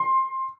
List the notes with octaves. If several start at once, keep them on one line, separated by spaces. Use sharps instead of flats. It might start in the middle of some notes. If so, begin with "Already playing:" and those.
Already playing: C6